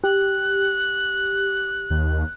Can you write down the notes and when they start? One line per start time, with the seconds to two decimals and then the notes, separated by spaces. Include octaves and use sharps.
0.04 G4 F#6
1.90 D#2